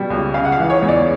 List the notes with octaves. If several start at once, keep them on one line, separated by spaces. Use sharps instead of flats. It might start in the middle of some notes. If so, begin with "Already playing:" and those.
Already playing: B2 G3
C#2
C#3 F5
F#5
F5
E3
C#5
E2
D5